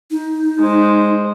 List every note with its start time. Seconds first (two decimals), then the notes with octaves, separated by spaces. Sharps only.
0.11 D#4
0.59 G#3 C5